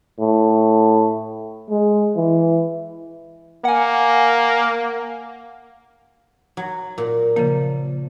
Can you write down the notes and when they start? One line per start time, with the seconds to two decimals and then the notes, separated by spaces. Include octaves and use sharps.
0.20 A2
1.70 G#3
2.16 E3
3.65 A#3 F#5 G#5
6.57 F#3
6.98 A#2
7.36 C#3 F3 A#3